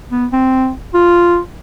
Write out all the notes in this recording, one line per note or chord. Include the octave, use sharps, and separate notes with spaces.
B3
C4
F4